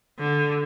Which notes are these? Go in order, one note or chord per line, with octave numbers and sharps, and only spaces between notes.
D3